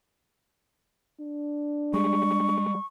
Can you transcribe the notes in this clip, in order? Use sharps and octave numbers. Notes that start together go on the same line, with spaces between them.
D4
G3 G#3 C#6